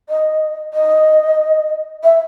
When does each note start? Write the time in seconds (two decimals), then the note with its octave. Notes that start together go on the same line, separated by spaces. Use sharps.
0.09 D#5
0.73 D#5
2.04 E5